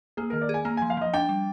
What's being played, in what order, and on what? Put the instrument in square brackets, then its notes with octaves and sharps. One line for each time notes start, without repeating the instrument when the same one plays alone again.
[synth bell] A#3 [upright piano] G#4
[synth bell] D#3 [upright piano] A#4
[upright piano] D5
[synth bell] G#4
[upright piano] G#5
[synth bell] A#3 [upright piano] A#5
[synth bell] F3 [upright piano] G#5
[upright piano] F5
[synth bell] F3 [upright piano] D#5
[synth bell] D4 [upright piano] G5
[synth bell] G3